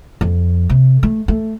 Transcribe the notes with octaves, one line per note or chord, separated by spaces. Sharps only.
F2
C3
A3
A3